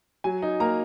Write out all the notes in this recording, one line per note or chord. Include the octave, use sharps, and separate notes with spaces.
F#3 G#5
D#4
A#3 A#5